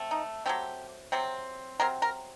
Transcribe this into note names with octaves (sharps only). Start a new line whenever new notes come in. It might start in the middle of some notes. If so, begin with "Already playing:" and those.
Already playing: A3 C4
D#4
F#3 A3 C4 G4
C3 F#3 C4
C3 F#3 C4 A#4
A#4